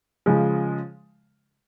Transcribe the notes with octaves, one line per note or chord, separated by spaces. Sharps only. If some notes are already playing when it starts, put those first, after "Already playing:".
C#3 F3 G#3